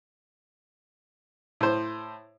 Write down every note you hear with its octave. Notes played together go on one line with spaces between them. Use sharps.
A2 C5